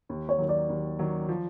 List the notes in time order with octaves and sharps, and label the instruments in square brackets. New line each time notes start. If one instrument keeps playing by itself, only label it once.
[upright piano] D#2
[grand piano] C#5
[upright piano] D#3 F#3
[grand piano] D5
[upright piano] D#2
D#3 F#3
F3